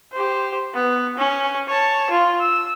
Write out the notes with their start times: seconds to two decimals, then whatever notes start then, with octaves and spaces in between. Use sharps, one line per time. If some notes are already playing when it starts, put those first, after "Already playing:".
0.12 G4 C5
0.74 B3
1.18 C#4
1.68 C#5 A5
2.10 F4
2.40 E6